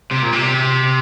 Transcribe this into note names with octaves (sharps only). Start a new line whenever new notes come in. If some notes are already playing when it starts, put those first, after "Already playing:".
C3
A#2
C3